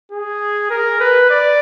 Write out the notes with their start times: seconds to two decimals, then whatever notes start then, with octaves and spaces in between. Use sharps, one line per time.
0.12 G#4
0.70 A#4
1.00 B4
1.30 D5